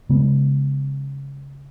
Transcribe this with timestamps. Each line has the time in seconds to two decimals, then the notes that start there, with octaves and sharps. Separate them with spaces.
0.09 C#3 G#3 B3